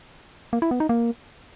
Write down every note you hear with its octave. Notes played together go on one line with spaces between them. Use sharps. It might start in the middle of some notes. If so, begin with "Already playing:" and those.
A#3
E4
B3
D#4
A#3